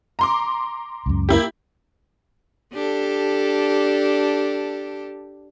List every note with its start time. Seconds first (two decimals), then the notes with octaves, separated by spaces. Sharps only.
0.19 A#5 C6 D6
1.06 C#2 F#2
1.29 A#3 E4 G4
2.73 D4 G4 A4